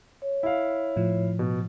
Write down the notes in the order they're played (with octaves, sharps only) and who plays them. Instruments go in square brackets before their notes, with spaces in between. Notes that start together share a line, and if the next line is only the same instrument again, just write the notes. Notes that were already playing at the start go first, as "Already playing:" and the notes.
[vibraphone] C#5
[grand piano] E4 F5
[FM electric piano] A2 F3
[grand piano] B2